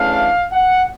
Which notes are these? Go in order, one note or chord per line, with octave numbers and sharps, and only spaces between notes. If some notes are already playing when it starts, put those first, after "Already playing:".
Already playing: C#3 E3 A3 D4 F5
F#5